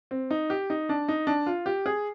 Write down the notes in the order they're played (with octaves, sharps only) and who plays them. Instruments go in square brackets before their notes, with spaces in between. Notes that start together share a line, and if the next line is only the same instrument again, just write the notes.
[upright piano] C4
D#4
G4
D#4
D4
D#4
D4
F4
G4
G#4